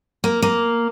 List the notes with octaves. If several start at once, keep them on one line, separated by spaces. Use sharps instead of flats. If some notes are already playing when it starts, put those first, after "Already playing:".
A#3
A#3